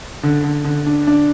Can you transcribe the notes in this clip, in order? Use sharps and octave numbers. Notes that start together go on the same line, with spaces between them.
D3
D3
D3
D4
D4